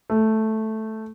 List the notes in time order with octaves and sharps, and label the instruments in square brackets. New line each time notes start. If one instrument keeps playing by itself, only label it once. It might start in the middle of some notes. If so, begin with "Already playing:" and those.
[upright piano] A3